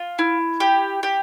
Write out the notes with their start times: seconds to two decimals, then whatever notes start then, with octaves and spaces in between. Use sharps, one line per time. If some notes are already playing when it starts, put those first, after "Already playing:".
Already playing: F4
0.19 E4
0.60 G4
1.03 G4